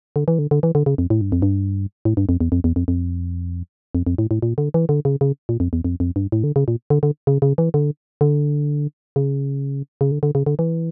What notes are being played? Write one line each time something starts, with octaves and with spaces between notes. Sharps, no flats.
D3
E3
D3
D3
E3
D3
C#3
F2
A2
G2
F2
G2
A2
G2
F2
E2
F2
E2
F2
F2
F2
F2
A2
A2
A#2
D3
E3
D3
C#3
C#3
A#2
F2
E2
F2
F2
G2
A2
D3
C#3
A#2
D3
D3
C#3
C#3
E3
D3
D3
C#3
C#3
D3
D3
C#3
D3
E3